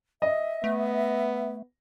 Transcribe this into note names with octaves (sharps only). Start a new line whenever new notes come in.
D#5 E5
A3 B3